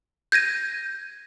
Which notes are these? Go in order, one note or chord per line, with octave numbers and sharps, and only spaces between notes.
G6 G#6 A#6 D#7